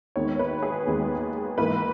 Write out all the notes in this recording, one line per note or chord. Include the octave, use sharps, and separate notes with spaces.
D#2 D#3 G#3 B3 C#5
B4
G#4
D#2 D#3 G#3 B3
G#2 E3 A#3 B4